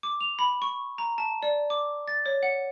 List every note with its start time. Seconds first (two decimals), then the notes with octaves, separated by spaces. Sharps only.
0.03 D6
0.21 F7
0.39 B5
0.62 C#6
0.98 A#5
1.18 A5
1.43 D5
1.70 D6
2.08 A6
2.26 C#5
2.43 F#5